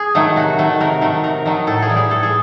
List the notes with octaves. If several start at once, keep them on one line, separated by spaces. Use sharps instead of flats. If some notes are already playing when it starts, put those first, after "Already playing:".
Already playing: G#4
D#3 F#3 A3
C3 F#4
D#3 F#3 A3
C3 A#4
D#3 F#3 A3
C3 A#4
D#3 F#3 A3
A2 A4
G#4
E3 G3
G#4
A2 A4
G#4